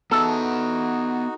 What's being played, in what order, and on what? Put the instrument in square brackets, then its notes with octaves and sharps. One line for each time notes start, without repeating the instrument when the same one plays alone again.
[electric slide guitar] B3 B4 E5 [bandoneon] D#4 F#4 [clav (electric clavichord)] A4